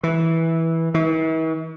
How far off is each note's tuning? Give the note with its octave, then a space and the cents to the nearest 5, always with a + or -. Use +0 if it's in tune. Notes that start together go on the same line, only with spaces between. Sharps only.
E3 -10
E3 -45